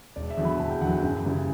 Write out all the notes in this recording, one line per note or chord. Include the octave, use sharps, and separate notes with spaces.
E1 D5
E5
E2 D3 F#3
B5
E1 A5
G5
E2 D3 F#3 F#5
G5
F#2
C#3 E3 G3